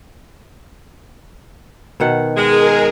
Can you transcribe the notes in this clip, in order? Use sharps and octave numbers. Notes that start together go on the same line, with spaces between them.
B2 D#3 F#5
G#3 G#4 A#4